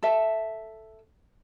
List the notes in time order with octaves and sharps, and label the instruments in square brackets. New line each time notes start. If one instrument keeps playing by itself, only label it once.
[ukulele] A4 E5